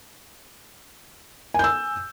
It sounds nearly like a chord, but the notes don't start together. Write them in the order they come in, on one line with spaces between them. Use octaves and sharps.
G#5 G6 E6